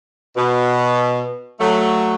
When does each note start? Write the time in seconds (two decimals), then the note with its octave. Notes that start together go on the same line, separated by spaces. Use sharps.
0.37 B2
1.60 F#3 A3